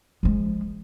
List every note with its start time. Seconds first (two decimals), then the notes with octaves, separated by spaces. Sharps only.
0.23 F3 G#3